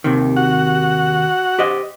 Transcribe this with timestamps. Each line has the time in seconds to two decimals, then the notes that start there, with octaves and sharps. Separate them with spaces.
0.04 D#2 C3 D#3
0.37 F#4 F#5
1.59 G4 C5 D#5